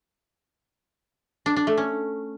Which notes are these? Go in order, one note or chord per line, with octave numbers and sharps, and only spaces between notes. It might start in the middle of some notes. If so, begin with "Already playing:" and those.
D4
D4
A3
C#4